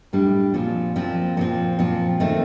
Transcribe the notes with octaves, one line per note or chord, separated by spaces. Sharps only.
A2 G3 D4
A#2 F3 C4
A#2 F3 C4
A#2 F3 C4
A#2 F3 C4
D#3 A3 C4